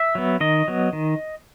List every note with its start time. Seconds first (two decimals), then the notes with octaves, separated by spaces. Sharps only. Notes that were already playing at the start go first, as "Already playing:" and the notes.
Already playing: E5
0.15 F#3 B3
0.40 D#3 D#5
0.68 F#3 B3
0.93 D#3